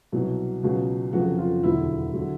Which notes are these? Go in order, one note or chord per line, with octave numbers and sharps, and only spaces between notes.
C2 B2 F#3
C#2 B2 F#3
F1 F2 C#3 F#3 F#4
F4
E1 D2 D3 F#3 E4
D3 F#3